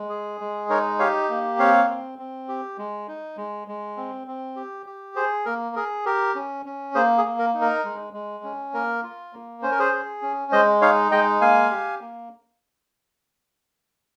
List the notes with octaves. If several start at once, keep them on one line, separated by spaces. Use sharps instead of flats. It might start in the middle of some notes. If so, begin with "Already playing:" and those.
Already playing: G#3
G#4
G#3
D#4 A#4 C#5
G4 C#5 F5
A#3
C4 C#5 F5
C4
C4
G4
G#3
D#4
G#3
G#3
C4
C4
G4
G4
G#4 C5
A#3 A#4
G#4 A#4
G4 A#4
C#4
C#4
A#3 G#4 C5
G#4
A#3
A#4
D#4
A#4
G#3
G#3
C#4
A#3 A#4
F4
A#3
C#4 C5
A#4
G#4 C5
G#4
C#4
G#3 C5 D#5
D#4 C#5 F5
G#3 D#5 G5
A#3 F5 G#5
G4
A#3